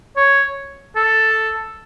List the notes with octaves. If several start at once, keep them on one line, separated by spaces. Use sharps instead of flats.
C#5
A4